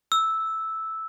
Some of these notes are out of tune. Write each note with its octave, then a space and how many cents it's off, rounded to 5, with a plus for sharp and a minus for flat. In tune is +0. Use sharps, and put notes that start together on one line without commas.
E6 -5